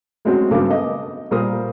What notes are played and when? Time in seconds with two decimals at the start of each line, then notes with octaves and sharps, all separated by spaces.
0.25 F#3 G#3 A3 C4 C#4 F#4
0.51 G2 C#3 F#3 A#3 A4 D6
0.68 B3 D#5
1.31 A#2 G3 A#4 C5 D#6